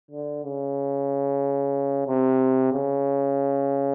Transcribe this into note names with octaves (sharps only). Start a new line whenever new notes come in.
D3
C#3
C3
C#3